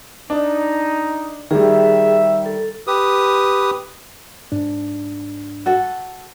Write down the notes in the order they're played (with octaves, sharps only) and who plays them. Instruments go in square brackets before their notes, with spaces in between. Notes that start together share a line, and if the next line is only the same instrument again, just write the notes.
[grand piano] D4 [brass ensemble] D#4
[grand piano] D#3 G3 [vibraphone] G#4 [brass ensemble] E5
[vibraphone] A4
[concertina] G4 B4 D#6
[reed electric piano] G#2 D4
[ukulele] F#4 A4 F#5